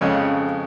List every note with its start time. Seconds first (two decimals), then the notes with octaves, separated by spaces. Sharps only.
0.01 F2 C#3 G#3 C#4